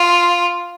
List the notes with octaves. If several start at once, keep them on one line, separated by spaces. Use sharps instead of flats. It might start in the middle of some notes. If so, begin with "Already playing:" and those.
Already playing: F4